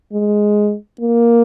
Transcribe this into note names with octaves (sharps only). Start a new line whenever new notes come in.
G#3
A#3